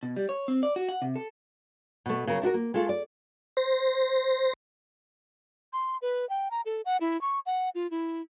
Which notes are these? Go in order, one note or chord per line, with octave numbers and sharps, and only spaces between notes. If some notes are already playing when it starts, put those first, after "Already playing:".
B2
G3
C#5
C4
D5
F#4
F#5
C3
A4
B2 A3
C#3 F#3 A#4
D4 E4 F#4 A#4
A#3
G#3 A3 F4 A4
D5
C5 A#6
C6
B4
G5
A#5
A4
F#5
E4
C#6
F#5
F4
E4